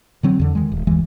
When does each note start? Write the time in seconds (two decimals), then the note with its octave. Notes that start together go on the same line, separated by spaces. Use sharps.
0.23 D3 F#3 C4
0.39 E2 D3
0.55 D#3 G#3
0.72 D#1
0.87 F#1 D#2 E3 G#3